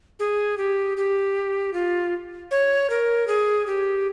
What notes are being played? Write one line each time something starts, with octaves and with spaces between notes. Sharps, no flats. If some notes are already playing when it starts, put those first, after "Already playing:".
G#4
G4
G4
F4
C#5
A#4
G#4
G4